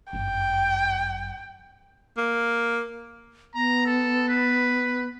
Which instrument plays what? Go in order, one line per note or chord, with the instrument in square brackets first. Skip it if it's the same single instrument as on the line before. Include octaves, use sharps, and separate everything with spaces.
[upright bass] G1 F#2 [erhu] G5
[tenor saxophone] A#3
[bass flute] B3 [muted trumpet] A#5
[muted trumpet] A4
B4